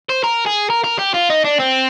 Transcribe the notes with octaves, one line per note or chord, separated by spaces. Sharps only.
C5
A#4
G#4
A#4
A#4
G4
F4
D#4
D4
C4